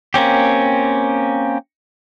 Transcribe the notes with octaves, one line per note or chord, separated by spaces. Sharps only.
A#3 C4 C#4 G4